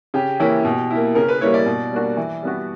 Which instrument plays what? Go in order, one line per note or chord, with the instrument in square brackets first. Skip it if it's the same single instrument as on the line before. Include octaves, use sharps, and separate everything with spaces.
[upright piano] C#3 [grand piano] G4
[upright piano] E3 A#3 C#4 E4
B2
A#3 E4
[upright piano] C#3 [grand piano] A#4
[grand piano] B4
[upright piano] G3 A#3 E4 [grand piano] C#5
[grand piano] D5
[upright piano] B2
G3 A#3 D4 F#4
E3
G3 B3 F#4